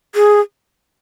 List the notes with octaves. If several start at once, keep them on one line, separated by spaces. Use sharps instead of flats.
G#4